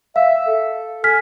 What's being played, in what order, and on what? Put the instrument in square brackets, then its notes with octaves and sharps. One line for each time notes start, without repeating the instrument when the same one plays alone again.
[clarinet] E5 [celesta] F5
[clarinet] A4
[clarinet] G#5 [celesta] F6 B6